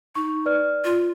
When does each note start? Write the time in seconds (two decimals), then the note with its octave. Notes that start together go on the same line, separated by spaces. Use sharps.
0.15 D#4 C#6
0.46 B4 D5 F6
0.84 F4